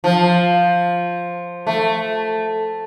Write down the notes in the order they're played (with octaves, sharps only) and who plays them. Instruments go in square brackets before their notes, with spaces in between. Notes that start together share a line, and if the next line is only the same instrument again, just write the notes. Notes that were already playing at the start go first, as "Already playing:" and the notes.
[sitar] F3
A3